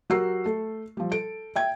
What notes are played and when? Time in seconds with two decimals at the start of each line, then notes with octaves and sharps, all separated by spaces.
0.10 F#3 F#4 G4 A#4 E6 C7
0.45 A3 A4
0.97 F3 G3
1.11 A4 D7
1.56 E5 G5 G#6